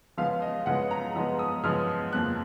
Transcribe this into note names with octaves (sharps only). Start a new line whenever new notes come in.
C#3 F3 G#3 B3 F5
D#5
C#3 F3 G#3 B3 F#5
A#5
C#3 F3 G#3 B3
D#6
C#3 F3 G#3 B3 F6
F2 F3 A#3 F#6